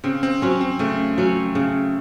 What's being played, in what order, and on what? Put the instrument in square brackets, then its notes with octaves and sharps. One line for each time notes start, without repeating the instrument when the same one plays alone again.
[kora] C#3 [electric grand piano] C4
[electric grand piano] C4
[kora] F#3 C#4 [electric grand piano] C4
[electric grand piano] C4
[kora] C#3 [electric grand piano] A3
[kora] F#3 C#4
C#3